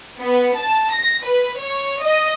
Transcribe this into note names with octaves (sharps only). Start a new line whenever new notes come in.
B3
A5
A#6
B4
C#5
D#5